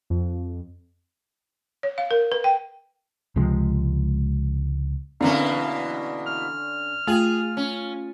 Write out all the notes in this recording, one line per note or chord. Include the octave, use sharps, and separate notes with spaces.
F2
C#5
F5
A#4
B4
G5
C#2 C3 F3 G#3
B2 D3 E3 A#3 C4 C#4 F5
F6
A3 F4 G#4
C#4